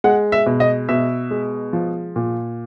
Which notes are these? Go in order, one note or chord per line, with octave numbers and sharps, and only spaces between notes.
G#3 F#5
E5
B2
D#5
B2 E5
G#3
F3
A#2